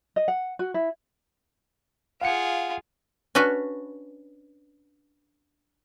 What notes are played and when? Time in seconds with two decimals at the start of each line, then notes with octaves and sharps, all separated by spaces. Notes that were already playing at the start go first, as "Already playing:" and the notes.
0.16 D#5
0.28 F#5
0.59 F#4
0.74 E4
2.21 F4 G#4 F5 F#5 C#7
3.35 C#4 D4 F#4 B4